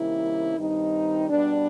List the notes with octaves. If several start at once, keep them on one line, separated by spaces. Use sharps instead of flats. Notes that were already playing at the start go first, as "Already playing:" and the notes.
Already playing: C3 D#3 G3 A#3 C#4 E4
G2 D#3 G3 C4 D#4
B2 G3 B3 D4